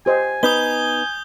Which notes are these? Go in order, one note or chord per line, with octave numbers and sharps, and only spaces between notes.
G4 C5 D#5 G#5
B3 D#4 B4 D#6 G6 G7